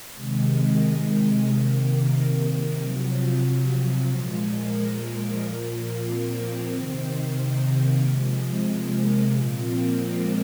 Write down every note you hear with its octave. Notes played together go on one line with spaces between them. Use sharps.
C3 D#3 G#3
C3 D#3 A#3
C3 F3 F#3
A#2 F3 G#3
A#3
A#2 F3
C4
C3 D#3
A#3
C3 F3 G#3
A#3
A#2 F3 C4
A#3
G#3